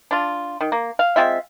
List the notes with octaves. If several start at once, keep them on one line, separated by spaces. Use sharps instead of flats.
D4 F4
D#3
A#3
F5
G#3 C4 F4 E5